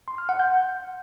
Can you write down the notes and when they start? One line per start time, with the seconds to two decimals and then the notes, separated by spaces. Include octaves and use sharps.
0.08 C6
0.18 F6
0.29 F#5
0.40 G6